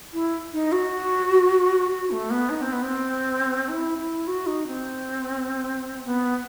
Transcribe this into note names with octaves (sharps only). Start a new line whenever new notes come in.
E4
D#4
F#4
F#4
A3
B3
D#4
C4
B3
C4
E4
E4
F#4
D#4
C4
B3